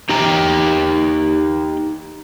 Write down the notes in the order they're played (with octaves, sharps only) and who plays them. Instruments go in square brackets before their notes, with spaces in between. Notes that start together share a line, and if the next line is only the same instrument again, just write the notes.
[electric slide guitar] D#4 G4 G5 A#5